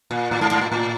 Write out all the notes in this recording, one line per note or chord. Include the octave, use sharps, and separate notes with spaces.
A#2
A2
G#2
G#2
A2
A2